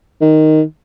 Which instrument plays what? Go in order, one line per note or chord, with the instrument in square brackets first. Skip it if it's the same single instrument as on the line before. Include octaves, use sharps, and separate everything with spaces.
[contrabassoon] D#3